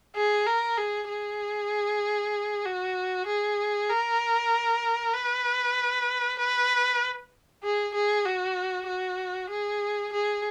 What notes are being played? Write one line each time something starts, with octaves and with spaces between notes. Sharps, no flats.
G#4
A#4
G#4
G#4
F#4
G#4
A#4
B4
B4
G#4
G#4
F#4
F#4
G#4
G#4